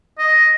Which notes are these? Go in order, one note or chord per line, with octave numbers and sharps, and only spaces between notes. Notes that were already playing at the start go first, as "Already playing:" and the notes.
D#5